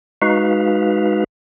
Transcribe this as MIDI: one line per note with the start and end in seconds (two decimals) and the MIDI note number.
0.22 1.24 56
0.22 1.24 63
0.22 1.24 66
0.22 1.24 71
0.22 1.24 77